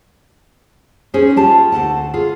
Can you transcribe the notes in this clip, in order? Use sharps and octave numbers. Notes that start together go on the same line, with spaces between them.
C#4 G#4 C5
F4 G4 A5
D2 A4 F#5 A5
F4 G#4